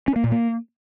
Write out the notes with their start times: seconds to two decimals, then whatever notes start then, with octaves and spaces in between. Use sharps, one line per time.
0.08 C#4
0.16 A#3
0.24 A#2
0.32 A#3